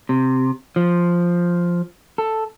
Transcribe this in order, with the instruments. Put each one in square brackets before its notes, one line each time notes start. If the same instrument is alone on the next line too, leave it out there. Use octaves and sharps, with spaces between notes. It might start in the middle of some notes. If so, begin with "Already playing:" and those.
[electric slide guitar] C3
F3
A4